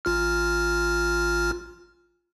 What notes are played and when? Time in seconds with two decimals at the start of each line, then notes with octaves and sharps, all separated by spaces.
0.05 A1 F4 F6